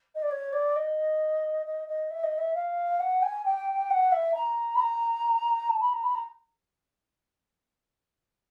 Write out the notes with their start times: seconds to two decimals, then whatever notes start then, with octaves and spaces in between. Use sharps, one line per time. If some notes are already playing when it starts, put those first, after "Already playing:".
0.15 D#5
0.22 D5
0.30 C#5
0.52 D5
0.75 D#5
1.65 D#5
1.88 D#5
2.10 E5
2.23 D#5
2.38 E5
2.54 F5
2.99 F#5
3.22 G#5
3.45 G5
3.90 F#5
4.12 E5
4.34 A#5
4.75 B5
4.80 A#5
5.69 A5
5.80 B5
5.92 A#5
6.03 B5
6.14 A#5